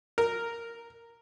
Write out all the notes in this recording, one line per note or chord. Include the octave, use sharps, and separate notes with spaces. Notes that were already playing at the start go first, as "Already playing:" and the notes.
A#4